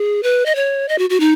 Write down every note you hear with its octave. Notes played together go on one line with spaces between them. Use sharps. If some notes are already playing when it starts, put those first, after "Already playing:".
Already playing: G#4
B4
D#5
C#5
D#5
F#4
F#4
D#4